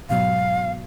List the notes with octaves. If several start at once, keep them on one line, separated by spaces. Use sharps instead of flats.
G#2 B2 F#3 F5